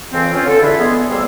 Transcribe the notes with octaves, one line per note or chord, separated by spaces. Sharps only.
F2 C#3 E3 C4
C#4 F4
D3 A4
D4 E4 F4 G#4 B4 E5
G#3 B3 G#4
C#2 C3 G3 A#3 C6 E6